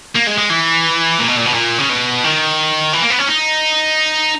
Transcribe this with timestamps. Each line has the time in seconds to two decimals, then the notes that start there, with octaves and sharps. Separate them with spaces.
0.15 A#3
0.27 G#3
0.38 G#3
0.50 E3
1.19 A#2
1.28 B2
1.37 A#2
1.46 B2
1.54 A#2
1.78 C#3
1.89 B2
2.24 D#3
2.93 E3
3.02 A#3
3.10 B3
3.19 C#4
3.28 D#4